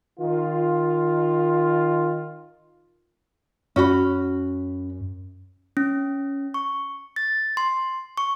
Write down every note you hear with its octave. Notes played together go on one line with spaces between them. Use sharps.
D#3 F4
F#2 C#4 F#4 B5
C#4
C#6
A6
C6
C#6